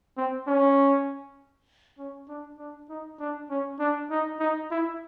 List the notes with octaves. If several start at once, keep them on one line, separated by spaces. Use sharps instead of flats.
C4
C#4
C#4
D4
D4
D#4
D4
C#4
D4
D#4
D#4
E4